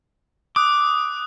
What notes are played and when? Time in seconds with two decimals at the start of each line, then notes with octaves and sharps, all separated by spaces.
0.56 D6 D#6 F#6